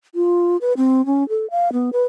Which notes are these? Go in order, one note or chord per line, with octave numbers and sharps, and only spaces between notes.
F4
B4
C4
C#4
A4
F5
B3
B4